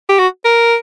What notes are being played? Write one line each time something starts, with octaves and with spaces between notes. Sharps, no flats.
G4
F#4
A#4